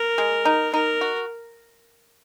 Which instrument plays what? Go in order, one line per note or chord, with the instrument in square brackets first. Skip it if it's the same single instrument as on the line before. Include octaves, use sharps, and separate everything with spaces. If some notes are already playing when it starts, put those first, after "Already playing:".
Already playing: [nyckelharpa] A#4
[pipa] G#3
D#4
[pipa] D#4 [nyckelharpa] A#4
[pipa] F#4